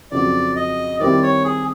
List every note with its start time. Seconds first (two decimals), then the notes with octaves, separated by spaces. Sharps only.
0.11 F2 C#3 F#3 D5
0.56 D#5
1.00 D#3 G3 C4 E4 G4 D5
1.23 C#5
1.44 G#4